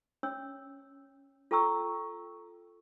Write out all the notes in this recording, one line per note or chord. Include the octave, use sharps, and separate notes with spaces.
C#4 C#5 E6
F4 A4 G5 A#5 C#6 E6